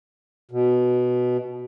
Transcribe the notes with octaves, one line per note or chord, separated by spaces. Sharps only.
B2